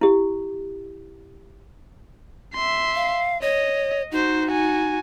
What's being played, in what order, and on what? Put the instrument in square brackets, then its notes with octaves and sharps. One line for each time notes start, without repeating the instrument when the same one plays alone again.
[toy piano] E4 G4
[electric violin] E5 C6
[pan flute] F5
[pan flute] C#5 [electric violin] D#5
[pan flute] D#4 [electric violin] F#4 C5
[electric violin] F#4 G#5